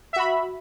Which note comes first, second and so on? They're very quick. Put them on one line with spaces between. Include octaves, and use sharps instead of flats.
E5 F#4 B5